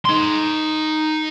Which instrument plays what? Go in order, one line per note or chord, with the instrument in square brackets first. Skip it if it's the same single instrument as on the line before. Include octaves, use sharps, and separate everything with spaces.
[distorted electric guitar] D#4 C6